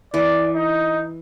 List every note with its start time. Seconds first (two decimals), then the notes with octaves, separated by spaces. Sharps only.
0.14 E3 D5
0.55 D#4